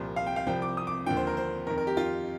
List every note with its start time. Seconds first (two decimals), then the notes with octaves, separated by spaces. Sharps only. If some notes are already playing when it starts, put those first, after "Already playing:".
Already playing: C2 A#2 F3
0.16 F5
0.27 G5
0.36 F5
0.47 C2 C3 F3 G5
0.62 D6
0.77 D#6
0.87 D6
1.06 D#2 D3 F3 G5
1.17 C5
1.27 A#4
1.37 C5
1.67 F2 D#3 A#4
1.78 A#4
1.87 G4
1.97 F4